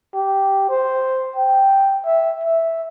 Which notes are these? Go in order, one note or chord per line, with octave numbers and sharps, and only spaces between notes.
G4
C5
G5
E5
E5